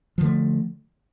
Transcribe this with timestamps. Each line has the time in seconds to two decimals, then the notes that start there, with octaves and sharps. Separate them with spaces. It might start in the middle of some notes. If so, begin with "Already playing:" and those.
0.18 F3
0.21 D3
0.24 A3